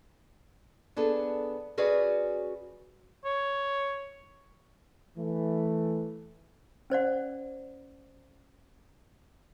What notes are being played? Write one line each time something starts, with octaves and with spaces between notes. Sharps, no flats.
B3 D4 G#4 A4
C#4 F#4 G#4 B4 D5 D#5
C#5
E3 A3
C#4 C5 D5 F#5